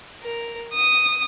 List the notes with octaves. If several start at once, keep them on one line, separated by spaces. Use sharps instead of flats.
A#4
D#6